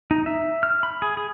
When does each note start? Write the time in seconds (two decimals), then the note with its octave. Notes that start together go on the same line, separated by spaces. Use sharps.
0.11 D#4
0.26 E5
0.63 F6
0.83 B5
1.02 G#4
1.17 G#4